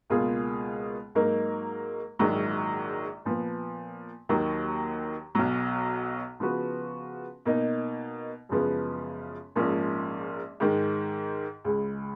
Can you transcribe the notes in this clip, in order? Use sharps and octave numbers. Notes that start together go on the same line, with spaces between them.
C#2 B2 A#3 F4 G#4
G#2 F#3 A#3 D#4 A#4
A#1 G#2 D#3 F#3
A#2 F3 B3
D#2 D#3 F#3
B1 B2 F#3
C#3 F3 B3 F#4 B4
B2 A#3 D#4
F#2 C#3 F3 G#3 B3
A#1 G#2 F3 A#3 C#4
G#2 D#3 G#3
C#2 C#3 G#3